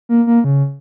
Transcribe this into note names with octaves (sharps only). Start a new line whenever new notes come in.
A#3
A#3
C#3